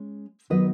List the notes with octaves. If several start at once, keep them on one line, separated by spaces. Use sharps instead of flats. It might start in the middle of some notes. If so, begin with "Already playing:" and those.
Already playing: G#3 C#4
D#3 F#3 B3 B4 D#5